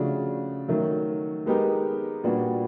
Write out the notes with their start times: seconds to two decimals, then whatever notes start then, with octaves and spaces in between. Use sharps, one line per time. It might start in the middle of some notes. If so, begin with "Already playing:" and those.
Already playing: C#3 F3 A3 D4 F#4
0.68 D#3 F#3 A3
1.46 G#3 B3 D#4 G4 A#4
2.24 A#2 G3 B3 D4 F#4